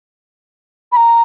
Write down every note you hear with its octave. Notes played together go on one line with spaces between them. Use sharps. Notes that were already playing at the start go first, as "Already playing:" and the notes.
B5
A#5